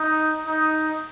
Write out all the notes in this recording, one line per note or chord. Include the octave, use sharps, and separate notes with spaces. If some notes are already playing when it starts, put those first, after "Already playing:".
Already playing: D#4
D#4